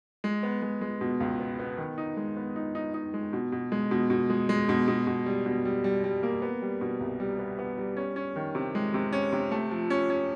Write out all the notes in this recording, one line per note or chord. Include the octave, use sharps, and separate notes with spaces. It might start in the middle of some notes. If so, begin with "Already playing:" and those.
G#3
B3
G#3
G#3
B2
C#2
B3
B3
D#3
D#4
G#3
B3
D#4
D#4
D#4
G#3
B2
B2
G#3
B2
B2
G#3
G#3
B2
B2
B2
G3
B2
G3
G3
G3
A#3
B3
G3
B2
C2
G3
B3
B3
G3
C#4
C#4
D#3
C3
G#3
C3
C#4
C3
A3
F3
C#4
C#4